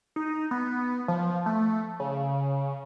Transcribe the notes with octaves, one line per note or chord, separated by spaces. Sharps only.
D#4
B3
F3
A3
C#3